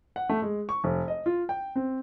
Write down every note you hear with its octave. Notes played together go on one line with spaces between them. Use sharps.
F#5
A3
G#3
C#6
F1
D#5
F4
G5
C4